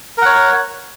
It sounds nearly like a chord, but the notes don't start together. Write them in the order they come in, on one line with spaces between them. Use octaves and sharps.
A#4 F#5 C#5